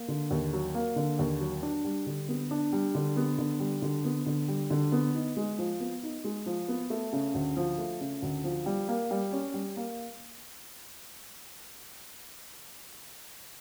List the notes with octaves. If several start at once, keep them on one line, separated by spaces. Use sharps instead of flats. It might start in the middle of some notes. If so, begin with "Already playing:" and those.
Already playing: A#3
D3
D#2
F#3
A#3
D3
D#2
F#3
D4
G3
D3
B3
D4
G3
D3
B3
D3
G3
D3
B3
D3
G3
D3
B3
D#4
G#3
F3
B3
D#4
G#3
F3
B3
A3
C#3
D2
F3
A3
C#3
D2
F3
G3
A#3
G3
C#4
G3
A#3